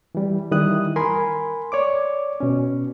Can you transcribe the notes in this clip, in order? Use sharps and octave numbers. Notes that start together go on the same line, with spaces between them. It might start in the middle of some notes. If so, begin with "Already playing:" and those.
E3 G3
D#3 E3 G3 E4 D#6 F#6
A#4 G#5 B5 C6
C#5 D5 D6
B2 C#4